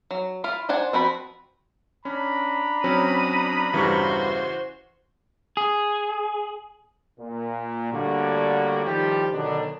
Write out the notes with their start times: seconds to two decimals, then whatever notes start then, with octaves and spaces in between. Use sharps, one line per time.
0.11 F#3
0.44 E4 F4 F5
0.69 D4 C5 D5 F#5 G#5
0.93 F3 C4 F#4 B5
2.05 C#4 D4 A#5 B5
2.84 F#3 C4 C#4 D#6
3.74 E2 G2 C#3 E3 F#4 C5 C#6
5.57 G#4
7.19 A#2
7.92 A2 D3 G3 A#3 D4 F#4
8.85 A2 D#3 F3 G3 G4
9.33 B2 D3 D#3 F#3 D4